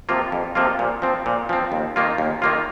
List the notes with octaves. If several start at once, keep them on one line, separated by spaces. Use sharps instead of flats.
C3 F3 A#3 F4
F2
C3 F3 A#3 F4
A#2
F3 C4
A#2
F3 C4
D#2
D#3 A#3 F4
D#2
D#3 A#3 F4